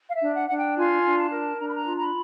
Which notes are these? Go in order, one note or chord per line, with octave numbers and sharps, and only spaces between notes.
F5
E5
D4
F#5
D4 F#5
G5
F4 G#5
D4
A5
A#4
D4 A#5
B5
A#5
F4
A#5
B5